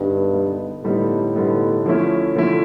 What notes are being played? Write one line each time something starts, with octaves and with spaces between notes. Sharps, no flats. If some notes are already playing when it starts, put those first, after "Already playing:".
Already playing: G2 D3 G3 B3 D#4
D3 G3 B3 D#4
A2 D3 G3 B3 D#4
D3 G3 B3 D#4
D3 F3 A3 C#4 E4
D3 F3 A3 C#4 E4